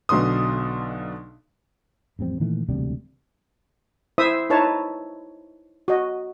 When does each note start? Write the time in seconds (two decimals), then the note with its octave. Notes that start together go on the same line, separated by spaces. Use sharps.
0.09 B1 B2 D3 C6 D#6
2.19 A1 F2 G3 C4
2.40 A#2 D#3 E3 A3
2.68 E1 D2 C3 G3
4.18 E4 C5 E5 D#6
4.50 D#4 E4 B4 C#5 A5
5.88 F#4 D#5